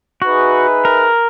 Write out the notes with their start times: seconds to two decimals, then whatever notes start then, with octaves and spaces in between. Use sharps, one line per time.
0.22 D#4 F#4 G#4 B4 E5
0.85 A#4